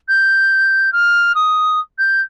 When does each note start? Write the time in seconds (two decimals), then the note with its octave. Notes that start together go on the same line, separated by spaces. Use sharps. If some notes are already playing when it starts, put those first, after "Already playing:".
0.08 G6
0.93 F6
1.35 D#6
1.98 G6